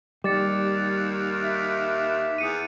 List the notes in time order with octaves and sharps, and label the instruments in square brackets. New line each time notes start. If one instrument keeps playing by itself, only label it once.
[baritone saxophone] D#2 [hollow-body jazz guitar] G3 [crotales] D6 A6 C#7
[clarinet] E5
[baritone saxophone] E2 [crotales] D#6 C#7 D#7